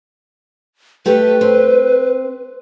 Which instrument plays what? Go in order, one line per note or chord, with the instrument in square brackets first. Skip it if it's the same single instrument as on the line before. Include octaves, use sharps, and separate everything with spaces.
[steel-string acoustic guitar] A3 G4 A4 [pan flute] B4
[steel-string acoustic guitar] C4